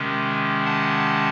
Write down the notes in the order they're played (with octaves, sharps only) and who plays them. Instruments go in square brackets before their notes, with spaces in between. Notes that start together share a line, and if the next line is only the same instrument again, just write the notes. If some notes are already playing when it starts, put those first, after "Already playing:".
Already playing: [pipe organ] C3 D#3 G#3 C#4
F#5 A5